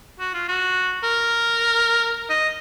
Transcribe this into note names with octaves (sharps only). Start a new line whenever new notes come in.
F#4
F4
F#4
A#4
D#5